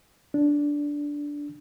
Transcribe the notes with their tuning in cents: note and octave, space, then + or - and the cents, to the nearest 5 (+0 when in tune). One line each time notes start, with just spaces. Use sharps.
D4 -10